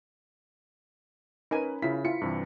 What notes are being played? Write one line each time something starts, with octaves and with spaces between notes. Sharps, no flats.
C#4 D#4 A#4 B4 G#5
C#3 E4 F4 B6
E4 F4 C#7
G2 C3 E3